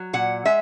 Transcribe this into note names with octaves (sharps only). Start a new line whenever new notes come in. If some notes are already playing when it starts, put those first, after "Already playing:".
Already playing: F#3
A#2 F#5
G#3 E5